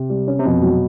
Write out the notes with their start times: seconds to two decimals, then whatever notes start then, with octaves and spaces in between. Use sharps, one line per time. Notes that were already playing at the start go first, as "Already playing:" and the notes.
Already playing: C3
0.10 G3
0.28 C#4
0.40 C3
0.45 F2 B2
0.62 F#3